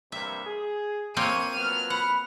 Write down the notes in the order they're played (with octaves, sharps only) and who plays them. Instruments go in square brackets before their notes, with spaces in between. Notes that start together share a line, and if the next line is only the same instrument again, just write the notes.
[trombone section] G2 C3 A#3 [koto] E5
[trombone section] G#4
[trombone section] A#1 F2 [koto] A#3 C4 C#5 [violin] C#6 D#7
[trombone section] F3 F#3 B3 [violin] F6
[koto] F#5 [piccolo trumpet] B5